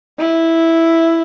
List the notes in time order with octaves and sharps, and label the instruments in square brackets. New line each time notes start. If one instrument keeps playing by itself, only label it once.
[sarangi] E4